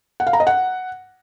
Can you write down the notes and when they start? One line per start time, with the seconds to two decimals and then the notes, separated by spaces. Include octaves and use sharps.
0.20 F#5
0.27 F5
0.33 A#5
0.40 D#5
0.47 F#5